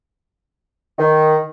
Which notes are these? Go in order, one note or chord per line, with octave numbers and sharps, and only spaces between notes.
D#3